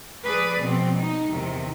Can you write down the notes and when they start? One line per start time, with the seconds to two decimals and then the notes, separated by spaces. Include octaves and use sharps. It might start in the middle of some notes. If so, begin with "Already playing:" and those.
0.23 F3 G#4 B4 D5
0.61 B2 F3 C4
0.97 D#4
1.30 E2 C3 D#3